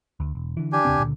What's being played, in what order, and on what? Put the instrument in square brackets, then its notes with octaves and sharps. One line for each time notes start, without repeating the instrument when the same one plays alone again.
[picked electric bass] D2
E1
D3 E3
[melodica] D4 G4 G#5
[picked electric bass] D#2 C#3 C4
C#2 A#2 D3